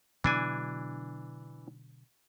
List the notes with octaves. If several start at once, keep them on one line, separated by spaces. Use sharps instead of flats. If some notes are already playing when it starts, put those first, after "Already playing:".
B2 D3 E3 F#3 D4 G#5